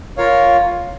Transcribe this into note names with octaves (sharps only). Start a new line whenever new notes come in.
F4 A#4 C#5 F5